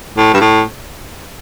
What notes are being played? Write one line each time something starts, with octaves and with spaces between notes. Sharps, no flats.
A2
G2
A2